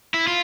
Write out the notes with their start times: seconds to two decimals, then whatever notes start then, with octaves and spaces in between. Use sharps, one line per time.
0.14 E4
0.27 F4